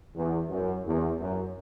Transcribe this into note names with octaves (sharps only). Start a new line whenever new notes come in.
E2
F#2
E2
F#2